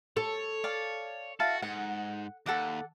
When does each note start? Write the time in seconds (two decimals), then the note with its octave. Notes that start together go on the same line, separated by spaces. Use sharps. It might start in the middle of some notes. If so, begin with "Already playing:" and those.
0.17 A4 C#5
0.64 D5 F5 A5
1.40 E4 F#4 F5 A5
1.62 G#2 F#5
2.46 D#2 A4 F#5 D6